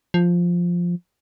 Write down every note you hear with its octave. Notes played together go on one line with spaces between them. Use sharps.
F3